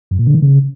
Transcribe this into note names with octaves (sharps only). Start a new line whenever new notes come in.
F#2
A#2
D3
D#3
C#3